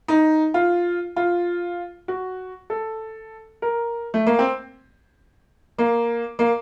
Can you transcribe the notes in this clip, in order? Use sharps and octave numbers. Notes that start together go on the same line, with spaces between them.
D#4
F4
F4
F#4
A4
A#4
A3
A#3
C4
A#3
A#3